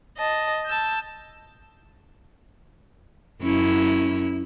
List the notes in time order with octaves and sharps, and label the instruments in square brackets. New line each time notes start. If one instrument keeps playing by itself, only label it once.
[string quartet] D#5 A5
A5 E6 G6
[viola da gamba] F#2 C#4 E4